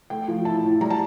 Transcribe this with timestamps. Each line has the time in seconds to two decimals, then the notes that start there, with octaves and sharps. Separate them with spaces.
0.10 A3 G5
0.28 F3
0.45 E4 A5
0.63 A2
0.81 G3 A#5
0.90 A5